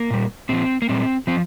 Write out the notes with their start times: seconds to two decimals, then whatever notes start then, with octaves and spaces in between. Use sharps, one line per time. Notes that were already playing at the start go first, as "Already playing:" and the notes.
Already playing: A#3
0.11 A#2 G3
0.49 A#2 F3 C4
0.82 A#3
0.89 A#2 G3 C4
1.27 F3 C4